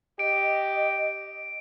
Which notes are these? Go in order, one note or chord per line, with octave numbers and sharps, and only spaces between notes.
G4 D#5 D7